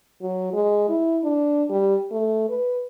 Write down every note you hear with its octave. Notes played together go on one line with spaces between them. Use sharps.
F#3
G#3
E4
D4
G3
A3
B4